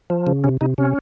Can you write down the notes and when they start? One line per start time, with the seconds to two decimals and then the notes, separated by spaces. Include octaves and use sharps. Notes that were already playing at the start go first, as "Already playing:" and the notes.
0.10 F3
0.27 C#3
0.44 C3 C#4
0.61 C3 D#4
0.78 C3 C#4